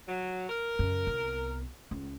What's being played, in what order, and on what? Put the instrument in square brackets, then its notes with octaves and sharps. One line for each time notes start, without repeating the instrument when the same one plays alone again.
[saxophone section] F#3
A#4
[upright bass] F#2 C#3
C2 B3
C#2